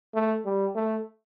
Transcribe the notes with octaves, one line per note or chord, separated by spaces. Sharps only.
A3
G3
A3